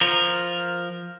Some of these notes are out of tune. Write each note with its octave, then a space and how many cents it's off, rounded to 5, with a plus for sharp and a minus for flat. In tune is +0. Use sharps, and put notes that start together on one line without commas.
F3 +0 A#4 +0